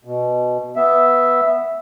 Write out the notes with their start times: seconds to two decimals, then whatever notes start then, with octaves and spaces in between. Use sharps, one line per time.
0.05 B2
0.76 B3 E5